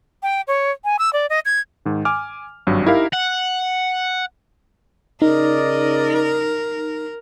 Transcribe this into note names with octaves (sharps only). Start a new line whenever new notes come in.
G5
C#5
G#5
E6
D5
D#5
G#6
G#2 D#3
G#5 D6 F6
G#1 G2 F#3
D#4 E4 G4 A#4 F5
F#5
C#3 D#4 A#4 D5 D#5